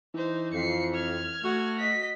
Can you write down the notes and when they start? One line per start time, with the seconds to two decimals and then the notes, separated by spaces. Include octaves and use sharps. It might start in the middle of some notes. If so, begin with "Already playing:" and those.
0.15 E3 D#4 C5
0.54 F2 C7 C#7
0.94 F6 G#6
1.44 A3 F#4
1.78 D#5 B6